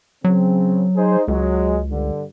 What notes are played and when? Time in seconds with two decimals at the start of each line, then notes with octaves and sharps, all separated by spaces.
0.24 C#3 F#3 C4
0.95 D#4 G#4 C5
1.28 C#2 F#3 G#3
1.90 G2 D3